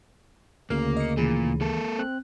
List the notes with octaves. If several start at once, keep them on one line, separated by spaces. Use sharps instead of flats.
D2 C#3 A#3 F6
D#5 C#7
A#2 D#3 E3 G#4
A#3 A4
C4 F#6